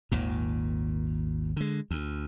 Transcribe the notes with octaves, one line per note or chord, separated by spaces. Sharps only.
G#1 D#2 A#2
D3 G#3
D2